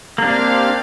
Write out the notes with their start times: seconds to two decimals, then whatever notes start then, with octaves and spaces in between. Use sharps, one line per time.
0.18 A#3 C4 D4 G4 F5